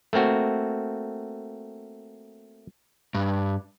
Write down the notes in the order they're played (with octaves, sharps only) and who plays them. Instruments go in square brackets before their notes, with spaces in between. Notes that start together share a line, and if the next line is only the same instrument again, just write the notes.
[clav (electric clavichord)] A3 A#3 C4 F#4
[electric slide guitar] G2